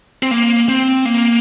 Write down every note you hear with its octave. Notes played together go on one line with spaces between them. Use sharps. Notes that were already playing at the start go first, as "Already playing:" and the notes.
C4
A#3
C4
A#3